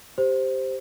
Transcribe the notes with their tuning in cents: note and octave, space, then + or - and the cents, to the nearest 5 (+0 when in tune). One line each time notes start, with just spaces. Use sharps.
G4 +0 C5 +0